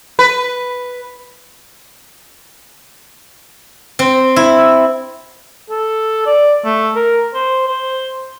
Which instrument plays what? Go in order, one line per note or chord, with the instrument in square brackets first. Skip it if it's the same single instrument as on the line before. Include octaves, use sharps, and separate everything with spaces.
[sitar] B4
[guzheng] C4
E4
[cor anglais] A4
D5
A3
A#4
C5
C5